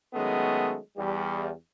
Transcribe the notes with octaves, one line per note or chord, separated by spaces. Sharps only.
D#3 F#3 G#3 A3 B3 C#4
E2 G3